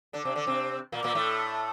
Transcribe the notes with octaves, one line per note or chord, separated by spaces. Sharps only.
D3 D4
C3 C4
D3 D4
C3 C4
A#2 A#3
A#2 A#3
A2 A3